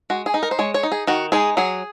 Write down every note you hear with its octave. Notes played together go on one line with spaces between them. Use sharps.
G#3 F#4
G#4
D#4
A#4
C5
G#3 C#5
C#5
D#4
G#4
D#3 F#4
G#3 D#4 G#4
F#3 G#4